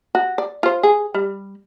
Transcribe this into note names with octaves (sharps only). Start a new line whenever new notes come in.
F#4
D5
F4 C5
G#4
G3